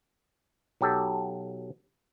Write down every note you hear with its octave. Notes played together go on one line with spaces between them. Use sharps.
B1 F#3 G4 A4